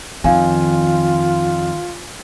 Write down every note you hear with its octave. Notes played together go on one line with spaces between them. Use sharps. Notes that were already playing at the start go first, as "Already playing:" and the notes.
F2 D#3 F4 F5 G#5